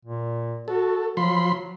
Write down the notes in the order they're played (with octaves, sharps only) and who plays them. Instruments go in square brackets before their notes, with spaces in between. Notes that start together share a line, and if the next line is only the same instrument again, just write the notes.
[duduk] A#2
[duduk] F#4 [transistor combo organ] A4
[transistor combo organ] F3 B5 C6 [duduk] F#3